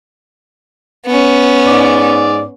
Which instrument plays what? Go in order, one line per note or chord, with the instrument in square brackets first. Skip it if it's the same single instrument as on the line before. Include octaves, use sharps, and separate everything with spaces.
[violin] B3 C#4
[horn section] G#2 D5